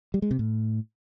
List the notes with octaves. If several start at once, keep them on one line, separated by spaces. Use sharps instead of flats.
G3
G#3
C3
A2